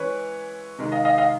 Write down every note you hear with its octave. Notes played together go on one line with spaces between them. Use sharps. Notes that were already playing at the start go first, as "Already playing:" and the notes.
Already playing: C#3 E3 G#3 B4 C#5
C3 D#3 G#3
D#5 F5
D#5 F5
D#5 F5